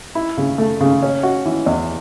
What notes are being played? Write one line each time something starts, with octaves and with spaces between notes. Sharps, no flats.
E4
C#3
A3
C#3
C#4
F#4
E3
E2